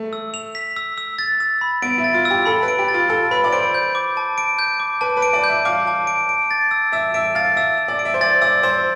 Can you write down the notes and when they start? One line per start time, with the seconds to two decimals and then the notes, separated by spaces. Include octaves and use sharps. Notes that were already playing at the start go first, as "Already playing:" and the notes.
Already playing: A3
0.13 E6
0.34 F7
0.55 B6
0.76 E6
0.98 E6
1.19 A6
1.40 E6
1.61 B5
1.82 B3 D7
1.98 E4
2.04 A6
2.14 F4
2.25 E6
2.31 G4
2.46 A4 B5
2.63 B4
2.68 D7
2.79 G4
2.88 A6
2.94 F4
3.09 A4 E6
3.31 B4 B5
3.44 D5
3.52 C5 D7
3.74 G6
3.95 D6
4.17 A5
4.38 D7
4.59 G6
4.80 D6
5.01 B4 A5
5.17 B4
5.22 D7
5.33 D5
5.44 G6
5.49 E5
5.65 F5 D6
5.87 A5
6.07 D7
6.29 D7
6.51 A6
6.71 E6
6.92 E5 E6
7.14 E5 D7
7.35 F5 A6
7.56 E5 E6
7.78 E6
7.88 D5
7.99 D7
8.05 E5
8.14 C5
8.21 D5 A6
8.42 D5 E6
8.63 C5 E6